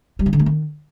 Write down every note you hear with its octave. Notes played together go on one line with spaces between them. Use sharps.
G3
C#3
D3
A3
D#3